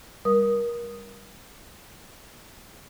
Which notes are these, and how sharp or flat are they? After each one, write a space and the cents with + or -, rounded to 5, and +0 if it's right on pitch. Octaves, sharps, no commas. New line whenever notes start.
G3 +20 A#4 +25 D#6 +0